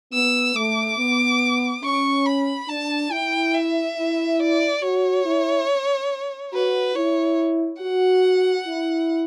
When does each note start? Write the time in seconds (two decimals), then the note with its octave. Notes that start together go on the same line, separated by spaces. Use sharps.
0.13 B3 E6
0.55 A3 D6
0.98 B3
1.83 C#4 C#6
2.26 B5
2.69 D4 A5
3.11 E4 G5
3.54 E5
3.96 E4
4.39 D5
4.82 F#4 C#5
5.26 E4
6.53 F#4 B4
6.95 E4 C#5
7.81 F#4 F#5
8.66 E4